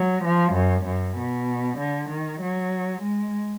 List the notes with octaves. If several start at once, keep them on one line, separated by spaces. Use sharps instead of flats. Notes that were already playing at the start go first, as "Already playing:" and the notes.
Already playing: F#3
F3
F#2
F#2
B2
D3
D#3
F#3
G#3